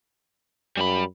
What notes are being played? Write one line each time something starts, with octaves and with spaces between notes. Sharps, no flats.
F#2 G3 B5